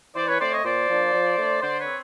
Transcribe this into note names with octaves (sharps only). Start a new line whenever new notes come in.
E3 C5 D5
B4 C#5
A3 C4 C5 D5
C#5 D#5
A#2 C5 D5
F3 A#3 D4
F3
A3 D4
D3 C5 D5
B4 C#5
C4